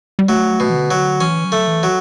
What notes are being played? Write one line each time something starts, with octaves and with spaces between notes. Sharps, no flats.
G3
F#3 A3
B2
E3
D3
F#3
E3 C#4
F#3
A3
E3
F#3